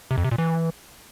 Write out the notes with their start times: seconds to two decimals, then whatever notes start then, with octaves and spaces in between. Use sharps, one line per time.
0.11 C3
0.18 F2
0.25 C3
0.31 A#2
0.38 E3